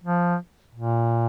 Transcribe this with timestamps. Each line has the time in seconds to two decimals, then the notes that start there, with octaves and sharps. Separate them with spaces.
0.04 F3
0.75 A#2